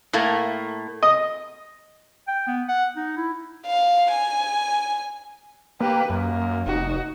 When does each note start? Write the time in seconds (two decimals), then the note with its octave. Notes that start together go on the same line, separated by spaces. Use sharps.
0.13 A2 A3 A#3
1.03 D#5
2.28 G5
2.47 B3
2.68 F#5
2.96 D#4
3.16 E4
3.67 F5
4.11 G#5
5.80 A#3 G4 B4
6.10 F#2 A#3
6.66 F1 D#4 F#4